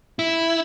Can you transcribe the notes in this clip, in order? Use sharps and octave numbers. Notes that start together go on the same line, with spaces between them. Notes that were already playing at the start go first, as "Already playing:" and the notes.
E4